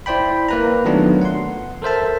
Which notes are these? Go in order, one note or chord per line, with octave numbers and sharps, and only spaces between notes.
E4 C5 D5 G5 B5
A#3 B4 A#5
D#3 F#3 A3 B3 D4 F4
F#5 C6
A4 A#4 C5 E5 A5